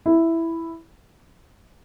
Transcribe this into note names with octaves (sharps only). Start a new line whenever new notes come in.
E4